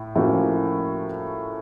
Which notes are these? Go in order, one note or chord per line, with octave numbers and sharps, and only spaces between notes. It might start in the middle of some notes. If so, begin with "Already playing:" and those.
Already playing: A2
A2 F3 A#3 C#4 F#4